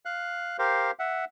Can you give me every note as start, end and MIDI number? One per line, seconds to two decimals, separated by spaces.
0.05 0.57 77
0.05 0.57 90
0.59 0.91 67
0.59 0.91 70
0.59 0.91 72
0.59 0.91 77
0.99 1.25 76
0.99 1.25 78